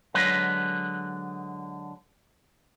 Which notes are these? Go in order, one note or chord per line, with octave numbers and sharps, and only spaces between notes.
D3 F#3 G#3 B4